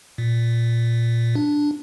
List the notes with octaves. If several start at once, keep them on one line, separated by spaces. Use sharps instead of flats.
A#2
D4